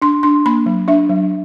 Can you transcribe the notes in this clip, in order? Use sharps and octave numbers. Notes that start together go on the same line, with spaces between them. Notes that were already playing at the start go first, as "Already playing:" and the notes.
D4 C6
D4 C6
A#3 B5
F#3
D4 E5
F#3